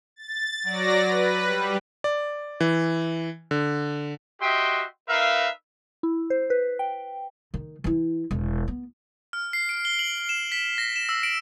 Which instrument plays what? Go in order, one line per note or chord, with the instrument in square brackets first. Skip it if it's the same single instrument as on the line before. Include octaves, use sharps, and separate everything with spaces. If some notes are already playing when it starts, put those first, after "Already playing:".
[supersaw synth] A6
F#3 D5 A#6
B4
G3
[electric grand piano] D5
E3
D3
[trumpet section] F#4 G4 D#5 E5 G5 C6
D#4 A#4 B4 E5 F5
[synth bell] E4
C5
B4
G5
[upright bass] D#3
E3 E4
E1
B3
[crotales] F6
C7
D7
G7
F#7
E7
B6
A#6
E7
E6
D7